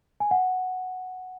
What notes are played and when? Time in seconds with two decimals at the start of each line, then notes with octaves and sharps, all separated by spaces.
0.20 G#5
0.31 F#5